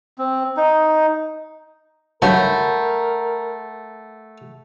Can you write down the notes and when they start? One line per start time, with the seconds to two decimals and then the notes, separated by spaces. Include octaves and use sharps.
0.18 C4
0.57 D#4
2.22 G2 C#3 F#3 A3 A#4 F#5 B5 G6